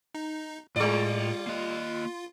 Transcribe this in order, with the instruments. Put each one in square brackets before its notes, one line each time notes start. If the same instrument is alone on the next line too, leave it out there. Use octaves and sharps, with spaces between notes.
[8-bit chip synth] D#4
[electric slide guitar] A2 [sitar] G3 D5 [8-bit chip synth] F4
[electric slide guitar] A#3 D#5